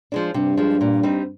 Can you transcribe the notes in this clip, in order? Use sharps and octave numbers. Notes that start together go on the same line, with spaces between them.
F3 G#3 D4
G2 C3
F3 G#3 D4
A#2
G3 C4 D#4